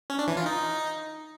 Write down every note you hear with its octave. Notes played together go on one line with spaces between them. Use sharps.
C#4
D4
E3
F4
D#4